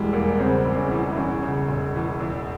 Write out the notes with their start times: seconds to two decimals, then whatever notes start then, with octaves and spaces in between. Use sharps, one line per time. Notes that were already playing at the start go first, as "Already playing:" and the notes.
Already playing: E1 E3 G3 G#3
0.13 E2 A#3
0.39 C#3 C4
0.65 E1
0.77 C#4
0.91 E3
1.12 E4
1.17 E2 C#4
1.43 C#3
1.68 E1
1.96 E3
2.20 E2